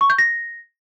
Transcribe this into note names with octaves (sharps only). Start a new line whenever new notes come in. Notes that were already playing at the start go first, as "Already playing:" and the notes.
C#6
G6
A#6